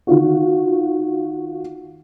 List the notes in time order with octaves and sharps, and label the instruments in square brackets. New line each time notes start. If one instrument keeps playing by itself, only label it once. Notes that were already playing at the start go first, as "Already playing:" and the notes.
[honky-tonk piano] D#3 F4 F#4